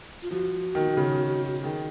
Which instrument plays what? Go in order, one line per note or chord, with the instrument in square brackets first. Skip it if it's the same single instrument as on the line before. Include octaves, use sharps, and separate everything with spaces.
[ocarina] F4
[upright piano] F3 [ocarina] F#4
[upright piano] D#3
C#3
[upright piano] D#3 [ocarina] G#4